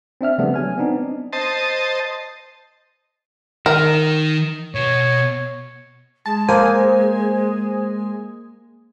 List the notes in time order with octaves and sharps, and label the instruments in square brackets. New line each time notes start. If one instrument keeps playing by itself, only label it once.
[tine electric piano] C4 D4 E5 F6
C#3 F3 G3 A3 B3 D4
F#3 G#5 F6
B3 C4 D4 D#4
[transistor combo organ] C5 D#5 A5
[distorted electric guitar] D#3 [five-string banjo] A#4
[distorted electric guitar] B2 [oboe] C#5
[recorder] G#3 [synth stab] A5
[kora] A#3 [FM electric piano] C5 [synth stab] G#5